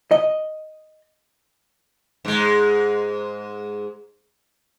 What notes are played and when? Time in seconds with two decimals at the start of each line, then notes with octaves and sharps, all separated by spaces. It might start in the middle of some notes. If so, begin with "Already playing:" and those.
0.11 D#5
2.25 G#2 G#3